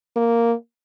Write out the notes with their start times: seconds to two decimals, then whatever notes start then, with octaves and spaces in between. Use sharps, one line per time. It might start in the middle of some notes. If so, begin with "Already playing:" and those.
0.16 A#3